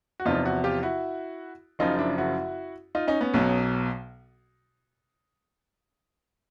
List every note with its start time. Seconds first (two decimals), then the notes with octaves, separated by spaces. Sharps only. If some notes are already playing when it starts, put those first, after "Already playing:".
0.20 F#4
0.25 E2 C3 F3 D#4 F4
0.45 E4 F#4
0.64 F4 G4
0.83 E4 F#4
1.79 F#1 F#2 C#3 F3 D#4 F4
1.99 D4 E4
2.18 E4 F#4
2.95 D#4 F4
3.08 C#4 D#4
3.21 B3 C#4
3.34 B1 B2 F#3